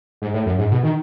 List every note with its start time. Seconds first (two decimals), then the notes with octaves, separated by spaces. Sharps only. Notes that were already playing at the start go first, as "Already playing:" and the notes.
0.22 G#2
0.33 A2
0.46 F#2
0.58 G#2
0.71 B2
0.83 D#3